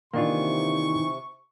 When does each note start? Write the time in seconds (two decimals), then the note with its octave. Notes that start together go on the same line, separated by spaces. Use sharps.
0.14 C3 D#3 E3 A#3 D4 F4 C#6